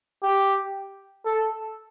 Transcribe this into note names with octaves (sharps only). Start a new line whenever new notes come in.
G4
A4